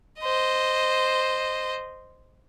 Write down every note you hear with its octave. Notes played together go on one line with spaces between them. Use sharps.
C5 D#5